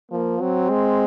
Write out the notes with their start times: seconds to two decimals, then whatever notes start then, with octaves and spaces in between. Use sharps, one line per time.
0.11 F3 A#3
0.41 F#3 C4
0.70 G#3